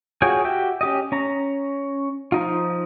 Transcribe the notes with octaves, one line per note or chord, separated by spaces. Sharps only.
F4 F#4 G#4 C#5 G5
F#4 G4 E5 G5
C#4 G4 D#5
C#4 A#5
F3 D#4 F4